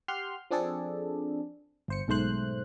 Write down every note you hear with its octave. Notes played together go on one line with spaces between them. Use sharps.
G4 F#5 C6 F6
F3 C4 D4 G#4 A4 D5
G1 C5 C#7
B1 G#2 A3 C5 F#6